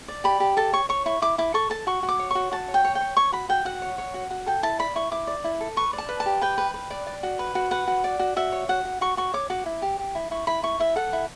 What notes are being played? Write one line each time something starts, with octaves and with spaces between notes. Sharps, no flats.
D5
G4 B5
G4
A4 A5
C#5 C#6
C#5 C#6
E4 C#6
E4 D6
E4 D6
A4 C#6
A4 A5
F#4 C#6
F#4
D6
C#5
F#4 C#6
F#4 A5
C#5
G5
C#5
G5
C#5
C#5 C#6
F#4 B5
F#4 G5
F#4 F#5
C#5
C#5
F#4
F#4
A4 G5
E4 A5
D5 B5
E4 C#6
E4 D6
D5
E4
A4
B4 C#6
D5
A5
B4
A5
G4
B4 G5
B4
B4
D5
D5
F#4
B4
F#4
B4 F#5
F#4
D5
F#4
F#4 E5
C#5
F#4 F#5
F#4
F#4 C#6
F#4 C#6
C#5 D6
F#4 D6
E4
G4
G4
E4
E4 C#6
E4 B5
E4 C#6
E4 E5
A4 F#5
E4